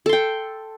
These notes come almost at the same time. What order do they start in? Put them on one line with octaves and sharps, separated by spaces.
A4 C6 G5